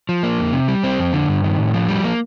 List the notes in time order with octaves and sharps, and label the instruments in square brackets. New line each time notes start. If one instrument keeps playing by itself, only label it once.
[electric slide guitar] F3
A#3
F2
C3
G3
C4
F2
D3
G2
D#3
A2
F3
G3
A#3